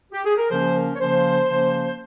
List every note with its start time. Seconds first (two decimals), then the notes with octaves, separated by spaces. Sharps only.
0.12 G4
0.25 G#4
0.37 A#4
0.50 C#3 F3 A#3 C#4 C5
0.75 A#4
0.94 C#5
0.99 C#3 F3 A#3 C#4 C5
1.49 C#3 F3 A#3 C#4